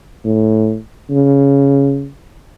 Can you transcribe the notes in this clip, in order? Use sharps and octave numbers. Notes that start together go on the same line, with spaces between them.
A2
C#3